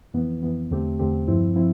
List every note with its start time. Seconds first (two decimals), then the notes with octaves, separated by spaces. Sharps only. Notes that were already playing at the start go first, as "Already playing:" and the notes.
0.14 F2 E3 B3
0.43 F2 E3 B3
0.71 E2 D3 A3 C4 G4
0.99 E2 D3 A3 C4 G4
1.28 G2 F3 C4 E4
1.56 F3 C4 E4